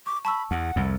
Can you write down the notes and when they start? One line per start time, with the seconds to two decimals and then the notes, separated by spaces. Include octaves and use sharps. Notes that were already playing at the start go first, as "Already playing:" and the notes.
0.06 C#6 D6
0.25 A5 B5 C#6 E6
0.51 E2 F#5
0.76 C2 F2